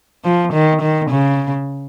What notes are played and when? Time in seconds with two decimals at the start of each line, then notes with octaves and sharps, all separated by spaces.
0.24 F3
0.53 D#3
0.82 D#3
1.10 C#3